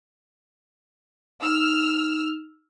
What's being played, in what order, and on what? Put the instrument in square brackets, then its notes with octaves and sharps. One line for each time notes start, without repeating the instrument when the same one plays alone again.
[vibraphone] D#4 [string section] E6 F6